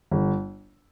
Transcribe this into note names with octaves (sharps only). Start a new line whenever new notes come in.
G1